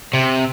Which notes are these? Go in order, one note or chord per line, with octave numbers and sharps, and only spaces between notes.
C3